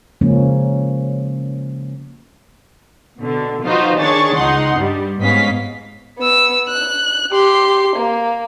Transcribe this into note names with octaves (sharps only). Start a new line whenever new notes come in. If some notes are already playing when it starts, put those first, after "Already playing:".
C#3 F3 G#3 A#3 C#4
B2 D3
F3 D#4 F4 F#4 B4 C5
D#3 D4 G#4 C#5 C#6 A6
C#2 D#4 F#5 C6
G2 G3
G#2 B3 C#4 D#5 F5 B6
B3 E6
F#6
G4 C6
A#3